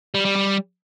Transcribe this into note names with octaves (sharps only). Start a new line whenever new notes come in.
G3
G3
G3